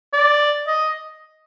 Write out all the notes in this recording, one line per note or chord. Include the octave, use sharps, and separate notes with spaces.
D5
D#5